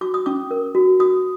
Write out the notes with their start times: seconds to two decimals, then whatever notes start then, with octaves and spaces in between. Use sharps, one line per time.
0.01 F#4 D6
0.14 D#6
0.26 C#4 D6
0.51 A#4
0.75 F#4
0.99 F#4 D#6